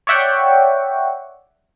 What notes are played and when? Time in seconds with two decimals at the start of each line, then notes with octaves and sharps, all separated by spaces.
0.07 C#5 D5 E5 F#5 G5 C#6